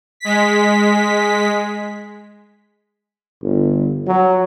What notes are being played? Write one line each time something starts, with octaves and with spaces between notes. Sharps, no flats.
G#3 B6
G1
F#3